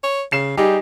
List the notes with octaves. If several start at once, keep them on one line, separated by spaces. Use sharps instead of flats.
C#5
C#3 C7 E7
G3 D#4 G4 G#4